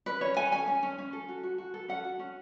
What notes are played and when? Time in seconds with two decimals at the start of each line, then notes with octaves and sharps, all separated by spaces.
0.06 C#4 B4
0.21 C#4 C#5
0.37 A4 G#5
0.52 C#4 G#5
0.68 C#4
0.83 C#4
0.98 C#4
1.13 A4
1.28 F#4
1.43 F#4
1.58 F#4
1.74 A4
1.88 C#4 F#5
2.04 F#4
2.19 C#4